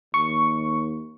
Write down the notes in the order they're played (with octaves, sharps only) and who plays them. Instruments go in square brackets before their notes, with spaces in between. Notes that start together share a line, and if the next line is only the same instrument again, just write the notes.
[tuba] D#2 [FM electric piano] C#6